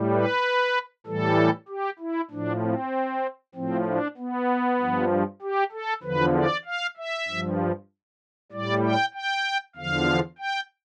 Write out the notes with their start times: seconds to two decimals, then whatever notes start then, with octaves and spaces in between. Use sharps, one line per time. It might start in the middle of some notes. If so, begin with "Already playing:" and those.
Already playing: A2 G3
0.13 B4
1.07 A2 E3 G3 A4
1.68 G4
1.99 E4
2.31 A2 F3 D4
2.62 C4
3.55 A2 F3 C4
3.86 D4
4.18 B3
4.80 G2 F3
5.42 G4
5.72 A4
6.03 E2 D3 F3 B4
6.35 D5
6.65 F5
6.97 E5
7.28 G2 F3
8.52 A2 G3 D5
8.84 G5
9.14 G5
9.76 E2 D3 F3 F5
10.38 G5